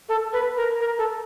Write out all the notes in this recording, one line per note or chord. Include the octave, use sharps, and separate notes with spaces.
A4
B4
A#4
A#4
A4